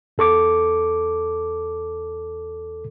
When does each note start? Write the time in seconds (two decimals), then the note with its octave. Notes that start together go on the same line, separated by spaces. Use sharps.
0.18 E2 A4 C#6 D6